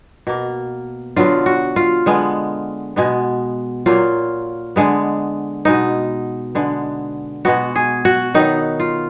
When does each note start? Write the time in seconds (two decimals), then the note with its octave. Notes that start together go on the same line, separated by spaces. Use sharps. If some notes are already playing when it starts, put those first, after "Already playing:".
0.27 B2 A#3
1.16 D3 F#3 B3 F4
1.46 F#4
1.76 F4
2.06 D3 G#3 B3
2.96 B2 G#3 B3
3.86 A#2 F#3 A#3 F4
4.76 D3 G#3 B3
5.65 B2 G#3 B3 D#4
6.55 D3 G#3 B3
7.45 B2 G#3 B3 F#4
7.75 G#4
8.05 F#4
8.34 D#3 F#3 B3 D#4
8.80 F4